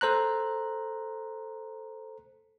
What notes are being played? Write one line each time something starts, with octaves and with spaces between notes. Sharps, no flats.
A4 C5 A#5 F#6